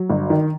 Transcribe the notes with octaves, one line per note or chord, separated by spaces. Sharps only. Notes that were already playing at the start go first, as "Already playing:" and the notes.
Already playing: F#3
G1
D#3